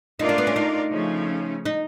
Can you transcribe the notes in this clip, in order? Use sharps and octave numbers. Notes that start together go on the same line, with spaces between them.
A3 D4 D#4 F4 A#4 D5
A#3
B3
C#4
D#4
C#3 F3 A3 C#4
D#4